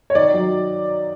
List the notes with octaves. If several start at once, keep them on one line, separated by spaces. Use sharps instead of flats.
C#5
D#3 D5
F#3